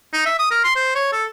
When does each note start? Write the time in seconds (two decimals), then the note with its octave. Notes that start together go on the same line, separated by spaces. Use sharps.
0.13 D#4
0.26 E5
0.39 D#6
0.51 A#4
0.64 C6
0.76 C5
0.96 C#5
1.13 A4